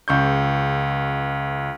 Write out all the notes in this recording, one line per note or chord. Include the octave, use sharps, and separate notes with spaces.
C#2 C#6 G6